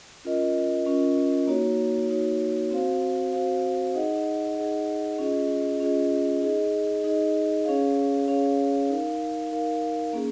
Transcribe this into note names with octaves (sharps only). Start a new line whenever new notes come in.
C#4 F4 A#4 D#5
C#4 F4 A#4 D#5
A#3 D#4 F#4 C#5
A#3 D#4 F#4 C#5
C4 F#4 C5 F5
C4 F#4 C5 F5
D#4 G#4 D#5 F#5
D#4 G#4 D#5 F#5
C#4 F4 G#4 D#5
C#4 F4 G#4 D#5
D#4 G#4 D#5
D#4 G#4 D#5
C#4 G#4 C#5 F5
C#4 G#4 C#5 F5
D#4 A#4 F5
D#4 A#4 F5
A#3 C#4 G#4